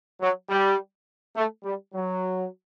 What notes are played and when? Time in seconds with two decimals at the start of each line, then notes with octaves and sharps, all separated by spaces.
0.20 F#3
0.49 G3
1.36 A3
1.64 G3
1.94 F#3